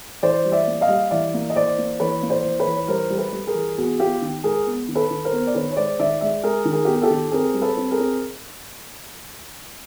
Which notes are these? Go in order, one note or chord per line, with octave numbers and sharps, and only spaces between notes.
E3 C5 D5
G3
D5 E5
A#3
D#5 F5
G3
E3 D5 E5
A#3
D#5
E3 C5 D5
A#3
E3 B4 C#5
A#3
C5 D5
E3
B4 C#5
E3
C#5
G3 A#4 C5
G3
A4 B4
G3
G#4 A#4
E3
B3 F#4 G#4
B3 F4 G4
D#3
G#3 G#4 A#4
B3
D#3
A4 B4
D#3
A#4 C5
B3
D5
D#3 B4 C#5
C#5
G#3 C5 D5
D#3 D5 E5
G#3 D5 E5
G#3 G#4 A#4
D#3
G#4 A#4
B3 G4
G#4
G4 A4
D#3
C4 G#4 A#4
G3
A4 B4
C4
G#4 A#4
C4